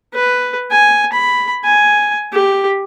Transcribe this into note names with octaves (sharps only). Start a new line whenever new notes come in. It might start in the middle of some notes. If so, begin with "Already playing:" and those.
B4
G#5
B5
G#5
G4